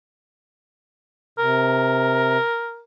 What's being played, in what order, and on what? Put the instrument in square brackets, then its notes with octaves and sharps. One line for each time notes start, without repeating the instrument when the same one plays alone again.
[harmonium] C3 [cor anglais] A#4